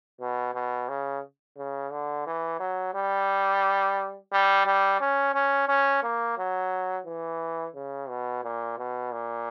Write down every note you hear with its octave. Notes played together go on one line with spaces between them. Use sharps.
B2
B2
C#3
C#3
D3
E3
F#3
G3
G3
G3
C#4
C#4
C#4
A#3
F#3
E3
C#3
B2
A#2
B2
A#2